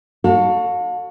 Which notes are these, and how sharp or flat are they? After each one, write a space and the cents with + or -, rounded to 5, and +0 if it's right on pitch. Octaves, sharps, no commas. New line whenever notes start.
F#4 +0 A4 +30 F5 +40